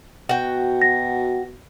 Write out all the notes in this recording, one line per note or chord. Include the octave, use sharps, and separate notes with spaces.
B2 F#4 G5
A#6